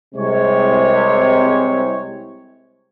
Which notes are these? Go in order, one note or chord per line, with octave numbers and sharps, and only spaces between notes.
C2 C3 G#3 C#5